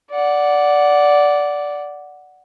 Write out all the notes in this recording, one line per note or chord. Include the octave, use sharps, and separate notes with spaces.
D5 F#5